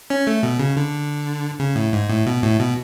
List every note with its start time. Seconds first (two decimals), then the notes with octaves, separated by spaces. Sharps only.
0.10 C#4
0.27 A3
0.43 B2
0.59 C#3
0.76 D3
1.59 C#3
1.76 A2
1.92 G#2
2.09 A2
2.26 B2
2.42 A2
2.59 B2